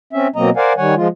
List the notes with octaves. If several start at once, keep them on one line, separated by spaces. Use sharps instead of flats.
C4 C#4 E5
B2 F#3 A#3 C4 D#5 A#5
A#4 C5 D5 F5 F#5 G#5
D#3 G3 C#5 F#5 G#5
F3 G#3 F4